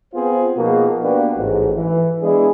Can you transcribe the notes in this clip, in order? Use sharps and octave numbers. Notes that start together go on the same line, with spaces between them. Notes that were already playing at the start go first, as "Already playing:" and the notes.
B3 C4 F4 G#4 C5
B2 F3 A#3 D#4 F#4 G#4
A#3 B3 D4 F#4 G4 B4
A1 G#2
E3
G#3 B3 D4 E4 G#4